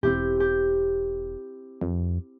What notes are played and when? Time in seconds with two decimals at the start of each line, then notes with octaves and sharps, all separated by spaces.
0.03 E1 C4 E4 G4
0.40 G4
1.81 F2